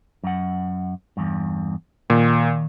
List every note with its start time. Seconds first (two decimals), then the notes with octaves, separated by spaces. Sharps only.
0.24 F#2 F#5
1.17 E2 G2
2.10 A#2 D#3